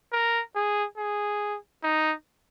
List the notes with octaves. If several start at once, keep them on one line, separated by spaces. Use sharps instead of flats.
A#4
G#4
G#4
D#4